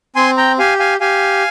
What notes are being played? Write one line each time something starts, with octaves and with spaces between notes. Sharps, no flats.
C4 G#5 C6
G5 A#5
G4 F5 G#5
F5 G#5
G4 F5 G#5